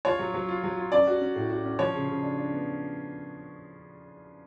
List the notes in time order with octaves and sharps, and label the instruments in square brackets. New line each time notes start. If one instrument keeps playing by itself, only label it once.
[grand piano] F4 [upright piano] C#5
[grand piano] F#3
F#3
F4
F#3
F4
[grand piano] C#4 [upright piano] D5
[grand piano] F#4
C#4
A2
F#4
C#4
[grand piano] F3 [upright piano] C#5
[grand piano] C#3
C#3
D4
D4
B3